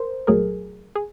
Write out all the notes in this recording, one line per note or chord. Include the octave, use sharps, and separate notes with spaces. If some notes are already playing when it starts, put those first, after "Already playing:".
Already playing: A#4 C5
C2 A#2 F#3 A3 G#4 A#4
G#4